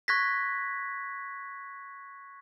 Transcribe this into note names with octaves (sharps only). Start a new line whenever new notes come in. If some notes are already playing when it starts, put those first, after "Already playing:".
C#6 F#6 G#6 A#6 B6